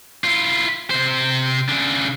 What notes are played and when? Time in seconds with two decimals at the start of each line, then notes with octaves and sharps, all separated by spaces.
0.24 E4 F4
0.90 C3 C5
1.69 C#3 D4